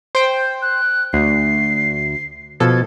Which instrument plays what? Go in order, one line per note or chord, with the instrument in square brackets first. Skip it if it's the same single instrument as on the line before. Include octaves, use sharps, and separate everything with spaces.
[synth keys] C5 G5
[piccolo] F#6
[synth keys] D2 [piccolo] C7
[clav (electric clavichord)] B2 F3 [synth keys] A4 [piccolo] G#6